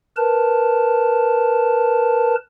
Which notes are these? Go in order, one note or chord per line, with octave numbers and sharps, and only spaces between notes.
A#4 B4 A5